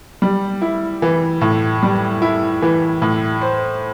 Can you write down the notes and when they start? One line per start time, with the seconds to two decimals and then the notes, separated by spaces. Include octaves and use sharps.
0.22 G3
0.62 E4
1.02 E3
1.41 A2
1.83 G3
2.22 E4
2.62 E3
3.02 A2
3.41 C5